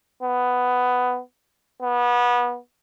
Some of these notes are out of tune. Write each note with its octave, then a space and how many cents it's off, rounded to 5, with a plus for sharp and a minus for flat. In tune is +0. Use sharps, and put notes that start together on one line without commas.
B3 +10
B3 -25